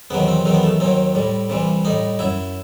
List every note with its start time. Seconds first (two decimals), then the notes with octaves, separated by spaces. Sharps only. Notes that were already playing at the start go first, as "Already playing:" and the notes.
0.10 E2 C3 D#3 F#3 B3
0.28 C4
0.46 E2 D#3 F#3 C4
0.54 B3
0.63 A3
0.80 D#2 D#3 F#3 C4
1.15 A2 G3
1.50 C2 C3 E3 G3
1.85 A2 G3 D#4
2.19 F#2 F#3 E4